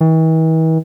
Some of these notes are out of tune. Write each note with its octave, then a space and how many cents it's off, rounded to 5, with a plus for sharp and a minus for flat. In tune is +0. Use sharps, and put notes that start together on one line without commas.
E3 -45